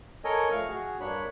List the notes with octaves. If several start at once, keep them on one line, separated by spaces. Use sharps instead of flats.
A4 A#4 C#5 D#5 G#5
F3 A3 F5 C#6 F6
F#4 G#4
G2 A#3 D4 C#5 B5